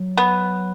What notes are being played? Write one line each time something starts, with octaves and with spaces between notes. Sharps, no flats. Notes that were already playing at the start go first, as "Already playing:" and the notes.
Already playing: F#3
B3